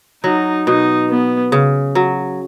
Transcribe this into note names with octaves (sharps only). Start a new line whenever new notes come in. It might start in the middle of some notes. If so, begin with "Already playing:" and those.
F#3 D#4
B2 D#4
B3
C#3
F#3